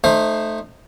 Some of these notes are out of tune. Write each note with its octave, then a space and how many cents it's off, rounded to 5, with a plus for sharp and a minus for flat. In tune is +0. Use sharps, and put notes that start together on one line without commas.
A3 +0 D#4 -20 C5 +15